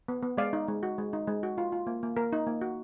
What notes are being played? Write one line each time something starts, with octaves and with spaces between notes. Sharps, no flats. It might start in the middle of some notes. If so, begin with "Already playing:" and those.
B3
B3
G#3 D5 F5
D#4
G#3
F#4
G#3
D#4
G#3
F#4
F4
F4
A#3
A#3
A#3 A#4
D#4
A#3
F#4